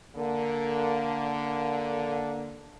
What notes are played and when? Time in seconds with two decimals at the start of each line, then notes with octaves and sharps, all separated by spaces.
0.16 D3 A#3